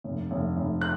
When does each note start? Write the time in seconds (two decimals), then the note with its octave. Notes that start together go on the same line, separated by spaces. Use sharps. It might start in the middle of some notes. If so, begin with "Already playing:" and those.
0.04 F1
0.31 F1
0.57 F1
0.81 F#6